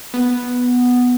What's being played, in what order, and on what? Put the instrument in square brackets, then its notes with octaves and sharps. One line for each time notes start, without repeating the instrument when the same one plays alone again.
[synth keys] B3